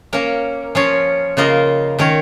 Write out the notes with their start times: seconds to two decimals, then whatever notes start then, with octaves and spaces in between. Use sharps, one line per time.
0.13 A#3 C#4 A#4 C#5
0.75 F3 C#4 F4 C#5
1.37 C#3 A#3 F4 A#4 D#5
1.99 D#3 C#4 A#4 C#5